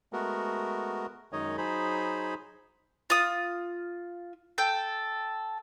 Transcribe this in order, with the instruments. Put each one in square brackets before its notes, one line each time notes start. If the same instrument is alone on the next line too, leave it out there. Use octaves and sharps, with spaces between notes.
[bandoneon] G#3 A3 B3 F#4 A#4
F#2 D#3 G#3 D#4 C#5 D#5
F#3 D#4 G#4 C5 B5
[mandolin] F4 D#6
A4 G5 G6